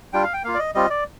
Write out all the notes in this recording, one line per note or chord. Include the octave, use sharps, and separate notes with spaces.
G3 D4 F4 G5
F5
G5
A#3 F4 F5
D5
D#5
G3 C4 F4 D#5
D5